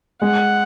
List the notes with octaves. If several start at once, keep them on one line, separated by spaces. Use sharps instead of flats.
G#3 F#5